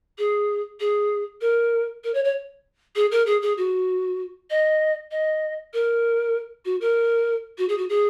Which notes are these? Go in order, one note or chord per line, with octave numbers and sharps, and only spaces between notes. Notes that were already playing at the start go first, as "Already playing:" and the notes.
G#4
G#4
A#4
A#4
C#5
C#5
G#4
A#4
G#4
G#4
F#4
D#5
D#5
A#4
F#4
A#4
F#4
G#4
F#4
G#4